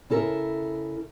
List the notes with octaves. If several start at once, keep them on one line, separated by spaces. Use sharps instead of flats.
C#3 E4 A4 A#4 E5